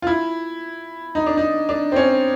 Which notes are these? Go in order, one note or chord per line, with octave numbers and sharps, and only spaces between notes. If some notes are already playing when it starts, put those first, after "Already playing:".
F4
E4
D#4
D4
D#4
D4
C4
C#4